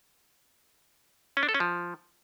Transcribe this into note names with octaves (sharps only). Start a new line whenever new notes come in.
C#4
D4
A4
C#4
F3